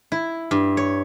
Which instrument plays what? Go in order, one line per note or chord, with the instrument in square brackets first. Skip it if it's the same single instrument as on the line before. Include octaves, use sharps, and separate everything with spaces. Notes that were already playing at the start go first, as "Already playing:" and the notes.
[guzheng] E4
G2
C#5